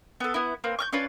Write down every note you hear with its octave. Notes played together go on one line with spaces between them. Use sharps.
B3 A4
B3 E4
A#3 C4 B4
C#6 F6 G6
C#4 D4 F4 B4